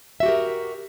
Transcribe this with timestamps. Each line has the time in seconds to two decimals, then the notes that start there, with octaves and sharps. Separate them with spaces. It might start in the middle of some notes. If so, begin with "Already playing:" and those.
0.20 E5
0.23 F#4
0.26 G4
0.28 A#4